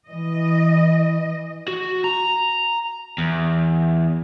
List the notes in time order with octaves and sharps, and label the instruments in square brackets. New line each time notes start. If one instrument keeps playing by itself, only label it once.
[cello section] E3 D#5
[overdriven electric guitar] F#4
A#5
E2